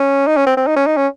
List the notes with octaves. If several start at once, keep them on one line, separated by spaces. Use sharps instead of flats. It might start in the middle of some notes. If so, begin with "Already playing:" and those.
Already playing: C#4
D#4
C#4
C4
C4
D#4
C#4
D#4
C#4